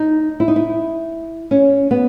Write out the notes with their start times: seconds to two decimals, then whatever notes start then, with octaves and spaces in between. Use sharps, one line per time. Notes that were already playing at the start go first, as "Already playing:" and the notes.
Already playing: D#4
0.40 E4
0.48 D#4
0.56 E4
1.51 C#4
1.91 B3